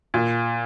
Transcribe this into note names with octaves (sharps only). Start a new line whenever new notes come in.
A#2